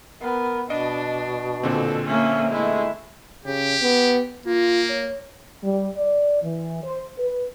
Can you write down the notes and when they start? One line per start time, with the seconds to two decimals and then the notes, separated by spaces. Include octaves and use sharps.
0.22 B3 A#4
0.70 B2 D4 D#5
1.63 A#2 D3 C4 A4
2.07 A#3 C#4 E5
2.51 G#3 A3 E4
3.46 C#3 G4
3.82 B3
4.46 A#3 F4
4.89 C#5
5.63 G3
5.96 D5
6.42 E3
6.83 C5
7.18 B4